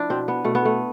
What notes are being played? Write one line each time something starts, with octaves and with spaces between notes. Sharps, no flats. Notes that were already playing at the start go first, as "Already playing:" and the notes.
Already playing: F3 D4 E4
B2 C4
B3
B2 A3
B3
A3